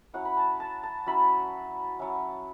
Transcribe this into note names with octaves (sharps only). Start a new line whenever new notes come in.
F#3 C#4 E4 F#5
B5
A5
A5
A5
F#3 C#4 E4 B5
F#3 C#4 E4